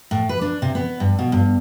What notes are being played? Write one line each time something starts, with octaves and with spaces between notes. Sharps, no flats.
A2
B4
D4
C3
B3
G2
B2
G2